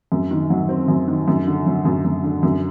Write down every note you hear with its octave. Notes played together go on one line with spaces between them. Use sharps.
F#2
D#3
F#3
C4
F#2
D#3
F#2
D3
F#3
F#2
F#2
D3
F#2